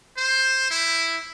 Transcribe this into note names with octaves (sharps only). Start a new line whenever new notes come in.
C5
E4